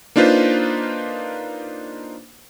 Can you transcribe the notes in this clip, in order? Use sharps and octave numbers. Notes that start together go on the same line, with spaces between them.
A#3 D4 D#4 F4 B4 C5